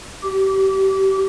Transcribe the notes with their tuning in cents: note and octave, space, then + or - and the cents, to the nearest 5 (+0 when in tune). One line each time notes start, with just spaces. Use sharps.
G4 -25